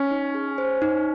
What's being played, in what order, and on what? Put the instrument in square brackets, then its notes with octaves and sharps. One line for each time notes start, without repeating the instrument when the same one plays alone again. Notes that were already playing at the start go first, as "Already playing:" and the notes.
Already playing: [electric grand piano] C#4
[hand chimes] D#4
G#4
C5
D#4